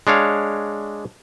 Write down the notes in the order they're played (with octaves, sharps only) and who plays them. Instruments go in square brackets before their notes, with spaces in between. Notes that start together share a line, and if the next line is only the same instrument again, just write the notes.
[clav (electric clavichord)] G#3 D4 C#5 F5